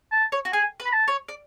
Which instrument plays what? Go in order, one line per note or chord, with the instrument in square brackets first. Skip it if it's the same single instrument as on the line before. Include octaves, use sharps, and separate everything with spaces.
[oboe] A5
[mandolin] C#5
F#4
[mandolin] G#4 [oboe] G#5
[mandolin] B4
[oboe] B5
A5
[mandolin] C#5
D5